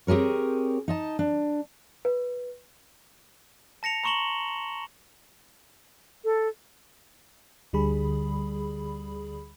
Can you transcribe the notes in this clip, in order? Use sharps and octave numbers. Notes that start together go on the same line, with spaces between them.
C4 G4 G#4 A#4 C#5
D#4 D#5 A5
D4
B4
A5 A#6 C#7 F7
A#5 C6 C#6 E7 F#7 G7
A4
D2 D3 G3 G#4 B5